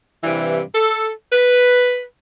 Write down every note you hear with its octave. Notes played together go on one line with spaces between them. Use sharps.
G2 C3 E3
A4
B4